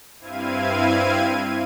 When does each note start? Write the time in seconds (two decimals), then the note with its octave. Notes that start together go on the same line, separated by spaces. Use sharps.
0.19 G2 C4 E4 F5 G#6 D#7